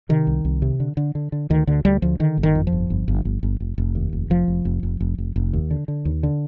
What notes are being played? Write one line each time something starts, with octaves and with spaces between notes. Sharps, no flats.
C3 D#3
C2
C2
C3
D3
D3
D3
D3
D2 D#3
D2 D3
D2 G3
D2 F3
D3 D#3
G1
D#3
F2
F3
G1
G1
G1
G1
G1
F1
F1
D#2
F1
F1 F3
F1
F1
F1
F1
F1
F1
D#2
D3
D3
D#2
D3